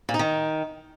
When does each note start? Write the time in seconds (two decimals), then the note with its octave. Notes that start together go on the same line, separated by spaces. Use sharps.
0.09 A#2
0.14 D#4
0.19 D#3